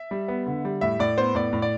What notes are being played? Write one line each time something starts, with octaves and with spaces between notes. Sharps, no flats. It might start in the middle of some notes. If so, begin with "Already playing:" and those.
Already playing: E5
G3
B3
D3
G3
A2 E5
A2 D5
B3 C5
A2 D5
A2
D5